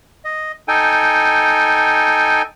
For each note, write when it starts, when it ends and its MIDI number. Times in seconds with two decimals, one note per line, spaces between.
0.25 0.52 75
0.68 2.42 63
0.68 2.42 69
0.68 2.42 79
0.68 2.42 80